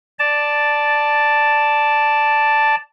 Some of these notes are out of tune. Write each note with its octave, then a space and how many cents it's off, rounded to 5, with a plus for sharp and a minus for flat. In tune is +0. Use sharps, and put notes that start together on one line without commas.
D5 +0 A5 +0